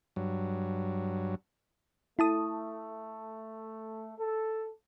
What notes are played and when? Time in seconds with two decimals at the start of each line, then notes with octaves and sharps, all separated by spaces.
0.16 G2 F#3
2.19 A3 E4 A5 D#6
4.18 A4